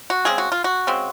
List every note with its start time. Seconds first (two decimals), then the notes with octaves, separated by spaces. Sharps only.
0.10 F#4
0.25 C#3 G#3 C4 G#4
0.38 F#4
0.52 F4
0.64 F#4
0.87 C#3 G#3 C4